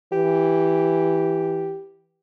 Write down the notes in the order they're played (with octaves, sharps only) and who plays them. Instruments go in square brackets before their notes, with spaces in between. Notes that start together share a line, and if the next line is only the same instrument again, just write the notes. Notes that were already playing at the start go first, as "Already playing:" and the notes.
[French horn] E3 [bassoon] G4